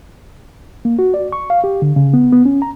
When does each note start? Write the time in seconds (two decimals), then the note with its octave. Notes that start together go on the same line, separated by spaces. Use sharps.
0.85 A#3
0.99 F#4
1.14 D5
1.32 C#6
1.50 F5
1.64 G4
1.82 D3
1.96 C#3
2.13 B3
2.33 B3
2.45 C#4
2.62 A#5